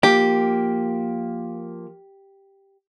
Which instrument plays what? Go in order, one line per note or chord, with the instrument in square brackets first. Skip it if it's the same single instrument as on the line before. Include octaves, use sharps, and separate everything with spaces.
[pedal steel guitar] F3 A#3 [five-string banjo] G4